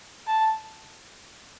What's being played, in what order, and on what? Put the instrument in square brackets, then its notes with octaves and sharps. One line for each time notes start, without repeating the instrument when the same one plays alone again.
[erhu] A5